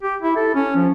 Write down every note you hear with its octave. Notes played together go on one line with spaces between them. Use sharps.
G4
E4
A4
C#4
F3